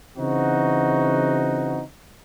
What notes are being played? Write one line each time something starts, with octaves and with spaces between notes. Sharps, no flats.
C#3 E3 C4 D#4 F#4